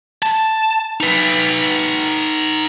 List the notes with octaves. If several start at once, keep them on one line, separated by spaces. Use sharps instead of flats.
A5
D#4 B4